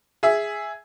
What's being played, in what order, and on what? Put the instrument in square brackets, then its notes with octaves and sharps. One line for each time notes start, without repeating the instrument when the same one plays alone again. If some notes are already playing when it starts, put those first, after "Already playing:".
[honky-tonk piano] G#4 E5